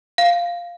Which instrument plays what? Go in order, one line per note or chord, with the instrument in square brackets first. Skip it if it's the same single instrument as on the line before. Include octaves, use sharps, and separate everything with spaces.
[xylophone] F5